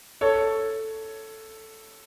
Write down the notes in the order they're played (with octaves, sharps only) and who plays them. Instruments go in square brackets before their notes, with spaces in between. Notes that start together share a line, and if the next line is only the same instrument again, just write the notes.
[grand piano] A4 C#5